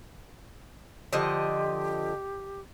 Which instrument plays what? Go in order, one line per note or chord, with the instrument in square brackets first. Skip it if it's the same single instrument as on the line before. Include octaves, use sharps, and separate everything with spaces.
[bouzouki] D3 F3 D#5 [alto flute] G4